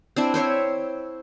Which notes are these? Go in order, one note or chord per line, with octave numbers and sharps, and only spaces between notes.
C4 D4 E4
C4 C5 C#5 E5